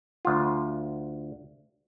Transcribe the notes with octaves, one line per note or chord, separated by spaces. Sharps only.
D2 F4